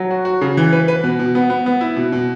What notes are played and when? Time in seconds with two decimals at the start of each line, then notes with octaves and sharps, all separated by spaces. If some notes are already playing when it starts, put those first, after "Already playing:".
Already playing: F#3
0.11 F#4
0.25 F#4
0.41 C#3
0.57 E3
0.73 B4
0.88 B4
1.04 B2
1.19 B2
1.35 B3
1.50 B3
1.66 B3
1.81 E4
1.96 B2
2.12 B2